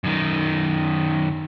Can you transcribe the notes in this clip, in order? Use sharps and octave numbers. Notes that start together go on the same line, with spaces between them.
F#2 D#3